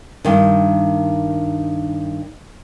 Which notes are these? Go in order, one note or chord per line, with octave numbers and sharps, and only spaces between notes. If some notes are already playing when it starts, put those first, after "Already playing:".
G2 D#3